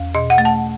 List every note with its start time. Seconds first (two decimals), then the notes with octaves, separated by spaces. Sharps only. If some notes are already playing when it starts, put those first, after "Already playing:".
Already playing: E2
0.15 B2 D#5
0.30 F#5
0.38 A3
0.45 A5